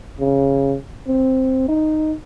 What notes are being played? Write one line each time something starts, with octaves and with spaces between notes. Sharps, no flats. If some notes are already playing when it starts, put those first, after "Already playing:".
C#3
C4
D#4